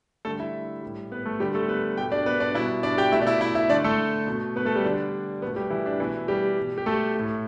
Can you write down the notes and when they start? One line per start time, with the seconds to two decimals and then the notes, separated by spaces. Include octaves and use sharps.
0.25 D3 G3 A3 A4
0.40 E4 E5
0.83 A2 G3
1.12 B3 B4
1.26 A3 A4
1.40 D3 G3 G4
1.55 A3 A4
1.69 B3 B4
1.97 B2 A3 G4 G5
2.12 D4 D5
2.26 B3 B4
2.40 D4 D5
2.55 B2 G3 E4 E5
2.83 D4 D5
2.98 G4 G5
3.12 A3 E4 E5
3.16 B2 D5
3.27 E4 E5
3.41 E4 E5
3.55 E4 E5
3.69 D3 A3 D4 D5
3.84 A3 A4
4.27 B2 A3
4.56 B3 B4
4.65 A3 A4
4.75 G3 G4
4.85 D3 G3 D4
5.42 B2 A3 B3
5.56 G3 G4
5.70 E3 E4
5.86 D4
6.00 B2 E3 A3 E4
6.28 G3 G4
6.58 B2 G3
6.78 G4
6.86 A3 A4
7.15 A2 A3